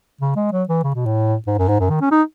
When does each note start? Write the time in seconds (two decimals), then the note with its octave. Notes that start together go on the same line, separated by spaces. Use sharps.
0.21 C#3
0.36 G#3
0.52 F#3
0.69 E3
0.84 C#3
0.95 B2
1.06 A2
1.47 G#2
1.58 F#2
1.69 G#2
1.80 F#2
1.90 D#3
2.01 C#4
2.11 D#4